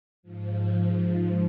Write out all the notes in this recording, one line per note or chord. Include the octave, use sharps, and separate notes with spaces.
G#2 F3